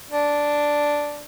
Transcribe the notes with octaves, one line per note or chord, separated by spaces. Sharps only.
D4